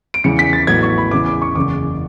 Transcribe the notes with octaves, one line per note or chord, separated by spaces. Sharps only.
D7
E2 C#3 E3 C#7
B6
A6
A1 A2 F#3 B3 G#6
C#6
B5
E2 C#3 E3 D6
D6
C#6
F#1 E2 C#3 D6